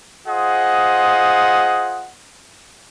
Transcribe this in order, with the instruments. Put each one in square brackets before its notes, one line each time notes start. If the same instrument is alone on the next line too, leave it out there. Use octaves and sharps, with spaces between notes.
[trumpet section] F4 G#4 C5 D#5 F#5